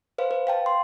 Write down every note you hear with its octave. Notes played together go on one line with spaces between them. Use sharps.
B4 C5 F5
B4
F5 G5 A5
C6